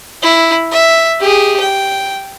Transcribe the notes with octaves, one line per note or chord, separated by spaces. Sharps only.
E4
E5
G4 G#4
G5